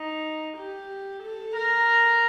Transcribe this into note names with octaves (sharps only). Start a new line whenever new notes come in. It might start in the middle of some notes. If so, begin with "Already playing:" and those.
Already playing: D#4
G4
A4
A#4